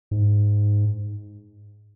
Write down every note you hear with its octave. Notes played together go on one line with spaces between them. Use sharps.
G#2